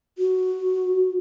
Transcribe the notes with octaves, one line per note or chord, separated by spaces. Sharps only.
F#4